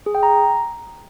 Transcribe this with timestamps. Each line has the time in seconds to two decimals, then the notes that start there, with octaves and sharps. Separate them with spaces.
0.06 G#4
0.15 G5
0.23 A#5